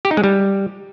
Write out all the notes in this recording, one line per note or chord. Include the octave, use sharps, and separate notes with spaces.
G4
D#4
G#3
G3